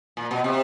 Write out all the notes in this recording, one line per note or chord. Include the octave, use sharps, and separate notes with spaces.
A#2
B2
C3